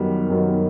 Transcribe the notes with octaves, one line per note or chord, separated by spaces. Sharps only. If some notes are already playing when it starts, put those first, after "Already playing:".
Already playing: F#2 D#3 G3 B3
F#2 D#3 G3 B3